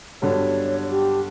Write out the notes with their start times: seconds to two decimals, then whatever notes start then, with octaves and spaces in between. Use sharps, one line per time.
0.22 G2 D3 F#3 B3 D4 C#5
0.90 G4